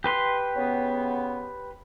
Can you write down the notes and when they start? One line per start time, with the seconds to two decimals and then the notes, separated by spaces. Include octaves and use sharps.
0.04 G4 B4 C6
0.55 C#3 B3